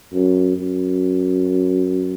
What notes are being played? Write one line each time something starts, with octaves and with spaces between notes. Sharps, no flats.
F#2
F#2